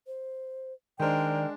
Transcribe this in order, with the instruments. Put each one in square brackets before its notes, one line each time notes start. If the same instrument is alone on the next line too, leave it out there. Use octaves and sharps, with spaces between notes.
[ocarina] C5
[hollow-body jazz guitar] D#3 C5 [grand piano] G#3 D4 [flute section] A#4 G5 [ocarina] D5